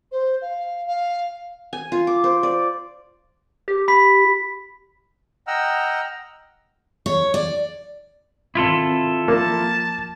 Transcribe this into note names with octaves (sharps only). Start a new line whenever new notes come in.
C5
F5
F5
G#5
F4
D6
C5
D5
G4
B5 B6
D#5 F#5 G5 A#5 E6 F6
C#5
D5
D#3 C4 E4 F4 A4
F3 A#3 A5